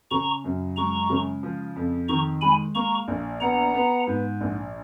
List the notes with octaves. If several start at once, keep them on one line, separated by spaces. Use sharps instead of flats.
C#3 A#5 C#6
F#2
G#3 A#5 C#6
C#3
F3
F2
D#3 A#5 C#6
G#3 G#5 B5
A#3 A#5 C#6
A#1
B3 F#5 A#5
B3
G#2
A#1